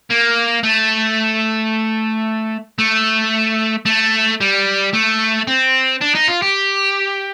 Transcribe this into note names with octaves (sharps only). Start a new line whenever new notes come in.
A#3
A3
A3
A3
G3
A3
C4
D4
D#4
F4
G4